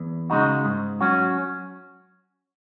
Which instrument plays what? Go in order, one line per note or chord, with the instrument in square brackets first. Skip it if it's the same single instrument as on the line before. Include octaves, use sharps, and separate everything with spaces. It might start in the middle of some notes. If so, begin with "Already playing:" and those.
Already playing: [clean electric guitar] E2
C#3 G#3 D#4 F#4
G#2
F#3 C#4 F#4